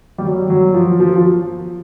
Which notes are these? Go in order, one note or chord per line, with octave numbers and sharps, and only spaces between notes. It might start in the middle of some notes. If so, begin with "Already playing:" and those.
G3
F#3
F#3
F3
F3
F3